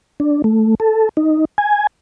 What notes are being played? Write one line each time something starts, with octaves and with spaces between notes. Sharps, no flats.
D4
A3
A4
D#4
G#5